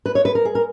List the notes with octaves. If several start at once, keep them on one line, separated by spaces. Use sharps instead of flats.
B4
C#5
B4
A#4
G#4
A#4